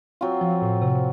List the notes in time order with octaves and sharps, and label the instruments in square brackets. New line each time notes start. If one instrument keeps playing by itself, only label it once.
[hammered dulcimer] F#3 C4 F4
[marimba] F3
A2
C3